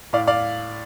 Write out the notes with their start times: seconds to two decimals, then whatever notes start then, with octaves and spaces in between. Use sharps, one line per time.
0.13 A2 D5 F5
0.27 D5 F5